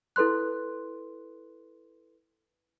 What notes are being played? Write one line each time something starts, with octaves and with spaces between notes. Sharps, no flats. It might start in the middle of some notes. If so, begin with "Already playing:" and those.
E4 A4 B4 C6 F#6